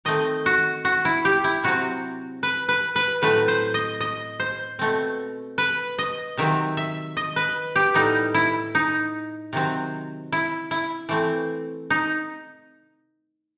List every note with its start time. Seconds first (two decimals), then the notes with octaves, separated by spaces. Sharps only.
0.05 D#3 A3 C4 D#5
0.46 F#4
0.85 F#4
1.05 E4
1.25 G4
1.44 E4
1.64 C3 F#3 C4 F#4
2.43 B4
2.69 B4
2.96 B4
3.22 A2 F#3 A3 C4 B4
3.48 C5
3.74 D#5
4.01 D#5
4.40 C5
4.79 B2 A3 C4
5.58 B4
5.98 D#5
6.37 C3 D#3 F#3 C4 E5
6.77 E5
7.17 D#5
7.36 B4
7.76 G4
7.94 A2 G3 B3 D#4
8.34 E4
8.75 D#4
9.53 C3 D#3 F#3 C4
10.32 E4
10.71 E4
11.09 E3 A3 C4
11.90 D#4